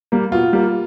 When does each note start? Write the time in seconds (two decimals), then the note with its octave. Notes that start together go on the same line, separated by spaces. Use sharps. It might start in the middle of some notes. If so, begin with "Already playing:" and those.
0.12 G3 A#3
0.32 B2 F4
0.53 G3 A#3